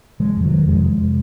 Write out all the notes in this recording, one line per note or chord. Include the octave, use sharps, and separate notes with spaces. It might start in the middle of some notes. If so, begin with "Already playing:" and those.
C3 F3 G#3
F2
D#3 F#3
C3
F2 F3 G#3
C3